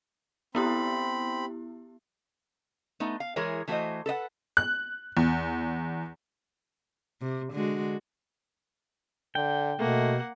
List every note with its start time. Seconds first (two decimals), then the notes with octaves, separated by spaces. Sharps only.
0.55 B3 C4 E4 G4 B5
3.00 A3 B3 D#4
3.20 F5
3.36 E3 G#3 E4 G#4 A#4 C#5
3.68 E3 A3 F#4 A#4 C5 D#5
4.06 A4 B4 D#5 F#5
4.57 F#6
5.17 E2
7.22 C3
7.53 D3 G#3 F#4
9.35 D3 G5
9.79 B2 A3 A#3 F#5